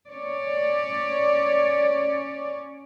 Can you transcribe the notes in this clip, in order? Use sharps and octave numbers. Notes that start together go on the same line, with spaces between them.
C#4 C#5 D5